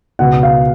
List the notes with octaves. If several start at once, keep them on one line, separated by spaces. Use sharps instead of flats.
C#2 B2 F#5
F5